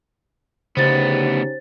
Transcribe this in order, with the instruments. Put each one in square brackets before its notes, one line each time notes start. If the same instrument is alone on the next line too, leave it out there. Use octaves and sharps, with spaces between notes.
[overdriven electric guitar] D2 B3 [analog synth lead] C#3 [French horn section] C#4 D#4 G4 [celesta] C5 A6